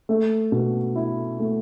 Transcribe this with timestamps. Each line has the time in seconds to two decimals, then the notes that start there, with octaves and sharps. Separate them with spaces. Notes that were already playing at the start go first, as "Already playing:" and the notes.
0.09 A3
0.52 B2
0.96 E4
1.40 A3